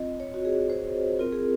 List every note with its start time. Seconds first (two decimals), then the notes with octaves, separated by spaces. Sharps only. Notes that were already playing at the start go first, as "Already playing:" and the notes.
Already playing: C4 F4 D#5
0.20 C#5
0.34 F#4
0.45 G#4
0.70 C5
1.19 C4 F4 A#4
1.33 G#4